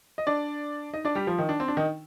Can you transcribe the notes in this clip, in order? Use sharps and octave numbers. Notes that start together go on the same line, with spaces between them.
D#5
D4 D5
D#4 D#5
D4 D5
G3 G4
F3 F4
D#3 D#4
D4
C4
D4
D#3 D#4